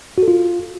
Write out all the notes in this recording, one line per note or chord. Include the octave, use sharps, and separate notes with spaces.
F#4
A4
F4